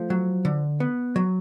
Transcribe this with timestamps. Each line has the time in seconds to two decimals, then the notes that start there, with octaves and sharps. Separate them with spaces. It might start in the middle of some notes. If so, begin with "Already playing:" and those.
Already playing: F3 A3
0.10 F#3
0.45 D3
0.80 B3
1.16 F#3